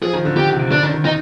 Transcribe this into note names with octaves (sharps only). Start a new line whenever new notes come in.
F3 G#4
D#3
D3
D#3 G4
C3
D3 D4
D#3
D#3
D#3 D#4